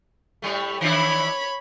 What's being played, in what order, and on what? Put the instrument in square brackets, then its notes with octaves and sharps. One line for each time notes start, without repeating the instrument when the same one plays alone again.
[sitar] A2 G3 A3
[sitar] D#3 D4 E4 [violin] C#5 B5